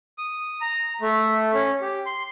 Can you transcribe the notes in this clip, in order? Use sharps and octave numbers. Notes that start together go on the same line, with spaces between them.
D#6
A#5
A3
C#4
G4
C6